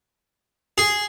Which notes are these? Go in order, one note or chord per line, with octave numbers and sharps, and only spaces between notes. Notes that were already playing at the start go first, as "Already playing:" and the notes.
G#4